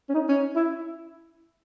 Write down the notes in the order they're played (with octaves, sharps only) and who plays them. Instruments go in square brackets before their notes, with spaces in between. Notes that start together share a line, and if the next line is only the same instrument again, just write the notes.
[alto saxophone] C#4
D#4
C#4
E4